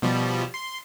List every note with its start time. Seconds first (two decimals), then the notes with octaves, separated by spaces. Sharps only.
0.02 B2 F3 G3
0.54 C6